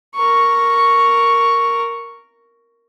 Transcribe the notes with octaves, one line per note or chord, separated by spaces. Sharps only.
A#4 C#6